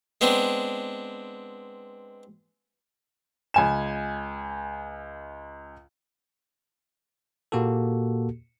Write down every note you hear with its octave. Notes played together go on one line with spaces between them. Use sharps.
G#3 B3 C4 D4
C#2 G#5 E7
A#2 A#3 F#4 G4 A4